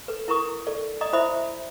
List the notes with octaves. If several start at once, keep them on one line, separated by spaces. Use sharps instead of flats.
A4 B4
E4 A#4 A#5 C#6 D#6
A4 D5
D5 D#5 A#5 D#6
E4 C5 E5 B5 D#6